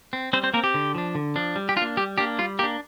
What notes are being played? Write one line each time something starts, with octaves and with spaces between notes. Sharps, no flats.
C4
G3 C4 C5
C4 C5
A#3 C4 A#4
G4
D3
F3 D4
D3
F3 D4
G3
G4
D4 F4
A#3
G3 G4
A#3 D4 G4
G3 F4
A#3 D4 G4